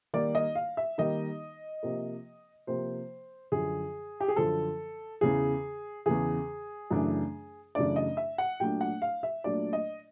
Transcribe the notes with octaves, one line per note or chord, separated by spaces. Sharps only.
D#3 G3 A#3 D#4 D5
D#5
F5
E5
D#3 G3 A#3 D#4 D#5
C3 F3 A#3
C3 F3 A#3 C5
F#2 D3 F3 G#4
G4
G#4
F#2 D3 F3 A4
E2 C#3 E3 G#4
E2 C#3 E3 G#4
F#2 C#3 E3 A3 D4
F#2 C#3 E3 A3 D4 D5
D#5
E5
F#5
A#2 F#3 A3 D4 G5
F#5
F5
E5
A#2 F#3 A3 D4 D5
D#5